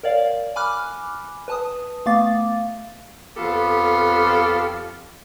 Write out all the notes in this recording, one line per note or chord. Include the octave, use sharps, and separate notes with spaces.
A#4 C#5 D5 F5
G#5 B5 D6 F6 F#6
B4 A5 D#6
A3 B3 F5 D6 A6
F2 B3 F4 G4 A4